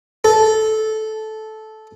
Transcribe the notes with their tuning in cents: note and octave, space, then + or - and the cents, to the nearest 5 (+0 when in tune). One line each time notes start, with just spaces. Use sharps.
A4 -15